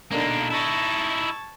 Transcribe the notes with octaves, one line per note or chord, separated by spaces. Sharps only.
B2 D3 A#3 D4 D#4
D#4 E4 A5 C#6 G#6